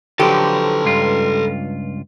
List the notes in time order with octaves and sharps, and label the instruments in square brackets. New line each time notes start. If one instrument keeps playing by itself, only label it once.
[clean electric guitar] D3 F3 F#3 [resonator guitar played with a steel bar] G4 [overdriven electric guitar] A4 B4
[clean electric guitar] C#2 G2 F4